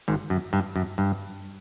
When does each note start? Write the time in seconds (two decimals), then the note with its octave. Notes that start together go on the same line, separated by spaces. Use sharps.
0.08 G#1 G#2
0.30 F#2
0.53 G2
0.76 F#2
0.98 G2